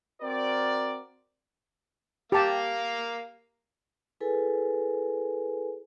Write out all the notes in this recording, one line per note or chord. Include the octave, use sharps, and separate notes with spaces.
C4 F#4 A#4 D5
A#3 G4 F5 A5
E4 G#4 A4 B4 G#5